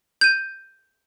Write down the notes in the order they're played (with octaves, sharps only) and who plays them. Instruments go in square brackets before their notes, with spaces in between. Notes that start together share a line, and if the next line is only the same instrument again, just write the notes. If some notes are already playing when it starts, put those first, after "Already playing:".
[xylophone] G6 D#7